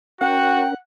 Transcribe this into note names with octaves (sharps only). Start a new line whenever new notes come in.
C#4 F#4 A#4 F#5 G5